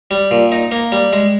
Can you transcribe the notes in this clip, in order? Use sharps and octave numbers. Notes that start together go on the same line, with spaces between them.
G3
A#2
D#4
A#3
G3
G#3